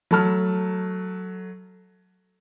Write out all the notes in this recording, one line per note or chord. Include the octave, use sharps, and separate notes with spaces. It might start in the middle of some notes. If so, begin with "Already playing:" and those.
F#3 A3 A5 F6